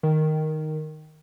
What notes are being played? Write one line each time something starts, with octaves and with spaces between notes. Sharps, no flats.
D#3